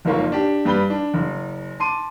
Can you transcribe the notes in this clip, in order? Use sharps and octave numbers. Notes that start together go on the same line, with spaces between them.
F#1 F2 G#2 A#3 F4 C#5
D4 G4
G2 G3 B4 B5 G7
D4
F#1
A5 C6 D6 D#7